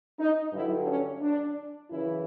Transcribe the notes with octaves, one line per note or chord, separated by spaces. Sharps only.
D#4
G2 D3 F#3 E4
C#4
D4
F#2 C#3 E3 E4